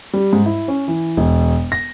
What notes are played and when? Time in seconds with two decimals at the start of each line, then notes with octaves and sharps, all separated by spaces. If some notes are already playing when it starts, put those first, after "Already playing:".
0.13 G3
0.33 G#2
0.46 E4
0.68 C#4
0.88 E3
1.17 E1
1.72 A#6